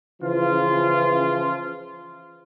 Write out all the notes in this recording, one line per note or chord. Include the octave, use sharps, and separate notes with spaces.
C#3 E3 F3 F4